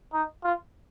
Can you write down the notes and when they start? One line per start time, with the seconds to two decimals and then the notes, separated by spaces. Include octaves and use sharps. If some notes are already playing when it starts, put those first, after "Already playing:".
0.13 D#4
0.44 F4